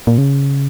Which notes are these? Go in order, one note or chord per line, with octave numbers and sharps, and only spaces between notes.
A#2
C#3